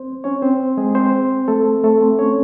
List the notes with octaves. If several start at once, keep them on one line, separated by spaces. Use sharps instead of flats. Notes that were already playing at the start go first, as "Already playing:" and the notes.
Already playing: C4 C5
C#4 C#5
C4 C5
G#3 G#4
C4 C5
A3 A4
A3 A4
C4 C5
C#4 C#5